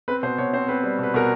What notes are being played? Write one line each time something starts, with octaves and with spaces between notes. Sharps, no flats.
C4 B4
B2 C5
B2 C#5
C4 C5
C4 B4
G3
B2 B4
B2 A#4